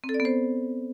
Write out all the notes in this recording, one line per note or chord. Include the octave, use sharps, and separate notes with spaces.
C4
A4
D5
B3
C5